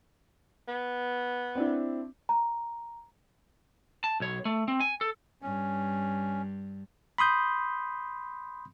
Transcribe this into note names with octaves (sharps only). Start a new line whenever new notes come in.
B3
C4 D4 E4
A#5
A5
B1 C#5
A3
C4
G#5
A4
G2 C#4
B5 C6 D#6 G6